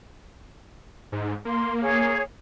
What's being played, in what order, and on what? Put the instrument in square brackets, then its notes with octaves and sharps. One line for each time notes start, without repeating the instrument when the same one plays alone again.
[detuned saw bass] G#2
[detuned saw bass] A#3 [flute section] C6
[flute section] G#4 C#5